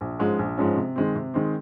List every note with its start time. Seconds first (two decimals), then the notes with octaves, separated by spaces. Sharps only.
0.01 A#1
0.19 G#2 F3 G#3 C#4
0.39 A#1
0.57 G#2 F3 G#3 C#4
0.77 C3
0.96 D#3 G#3 C4
1.15 C3
1.34 D#3 G#3 C4